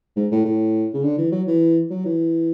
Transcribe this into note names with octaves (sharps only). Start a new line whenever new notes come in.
G#2
A2
A2
C#3
D3
E3
F#3
E3
F#3
E3